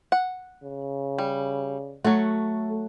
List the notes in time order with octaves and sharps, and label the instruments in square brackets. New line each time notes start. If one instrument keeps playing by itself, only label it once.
[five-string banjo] F#5
[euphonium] C#3
[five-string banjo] G3
[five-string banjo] F#3 F#4 [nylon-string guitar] A3